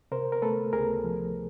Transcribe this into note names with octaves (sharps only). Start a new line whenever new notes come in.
C3 A#4 C5
A#4
A3 A4 B4
C#2 G#4 A#4
F3